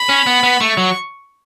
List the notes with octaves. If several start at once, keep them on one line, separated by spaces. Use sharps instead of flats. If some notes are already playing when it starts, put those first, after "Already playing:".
Already playing: B5
C#4
B3
B3
A3 C#6
F#3